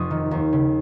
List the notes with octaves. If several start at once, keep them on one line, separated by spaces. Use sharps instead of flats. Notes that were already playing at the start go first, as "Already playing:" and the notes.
Already playing: F1 F2 C#6 D#6
D#3
D#2
C#3